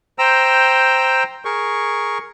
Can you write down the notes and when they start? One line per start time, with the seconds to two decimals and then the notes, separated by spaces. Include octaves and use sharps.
0.19 C5 G5 A#5 E6
1.45 G#4 A#4 C#6